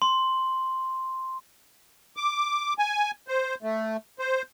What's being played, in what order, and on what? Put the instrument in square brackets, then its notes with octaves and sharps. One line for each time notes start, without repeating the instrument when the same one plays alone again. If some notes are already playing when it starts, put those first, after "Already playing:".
[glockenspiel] C6
[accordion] D6
G#5
C5
A3
C5